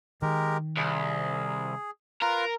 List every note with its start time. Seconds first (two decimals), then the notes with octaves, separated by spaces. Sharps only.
0.22 D#3 G#3 G4 A#4
0.77 C2 G#4
2.22 F4 A#4 B4 F5